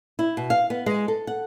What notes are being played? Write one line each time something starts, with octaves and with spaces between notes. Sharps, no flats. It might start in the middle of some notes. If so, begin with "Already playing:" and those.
E4
B2
F5
B3
G#3
A4
F#5